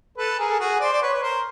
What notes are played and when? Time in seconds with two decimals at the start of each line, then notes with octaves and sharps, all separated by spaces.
0.17 A4 B4
0.39 G#4 A#4
0.50 A4
0.59 F#4 G#4
0.80 C5 D5
0.92 D5
1.02 B4 C#5
1.13 B4
1.22 A#4 C5